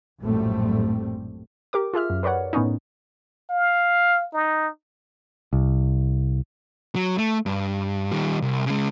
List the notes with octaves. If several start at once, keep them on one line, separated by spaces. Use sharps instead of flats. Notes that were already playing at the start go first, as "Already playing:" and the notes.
A#1 F#2 A2 G3 A3 C4
G4 A#4 D6
F4 G#4 E5 F6
F#2
A#4 B4 C#5 D5 F#5
A2 B3 C#4 D#4
F5
D#4
C2
F#3
A3
G2
D#3 G3
C2
C#3 G#3